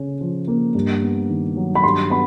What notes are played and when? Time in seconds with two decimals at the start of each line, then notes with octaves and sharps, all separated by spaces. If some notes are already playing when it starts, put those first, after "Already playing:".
Already playing: C#3 C#4
0.21 F3
0.48 A#3
0.75 G2
1.03 B3
1.30 D#3
1.56 F#3
1.75 B5
1.84 G2 C6
2.10 B3 B5